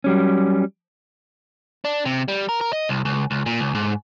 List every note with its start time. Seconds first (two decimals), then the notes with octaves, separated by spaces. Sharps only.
0.04 F#3 G3 C#4
1.85 D4
2.05 C3
2.28 G3
2.49 A#4
2.61 A#4
2.73 D#5
2.89 C2
3.05 C#2
3.31 C#2
3.46 A#2
3.60 C#2
3.75 G#2